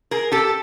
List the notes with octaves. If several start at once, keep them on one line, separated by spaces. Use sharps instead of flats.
G#4 A#4
G4 A4